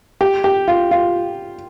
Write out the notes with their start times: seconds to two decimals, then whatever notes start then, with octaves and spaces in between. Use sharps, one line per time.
0.21 G4
0.44 G4
0.68 F4
0.91 F4